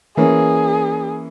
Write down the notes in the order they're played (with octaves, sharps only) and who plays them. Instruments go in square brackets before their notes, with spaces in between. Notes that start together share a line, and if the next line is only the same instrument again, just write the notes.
[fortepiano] E3 A#3 C#4 [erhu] G#4